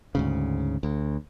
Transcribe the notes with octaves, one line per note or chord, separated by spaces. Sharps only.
D2 G#2 C#3
D2